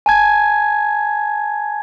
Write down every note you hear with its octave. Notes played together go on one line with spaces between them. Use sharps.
G#5 A5 G#6